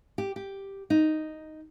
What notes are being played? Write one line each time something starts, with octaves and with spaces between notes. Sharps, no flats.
G4
G4
D#4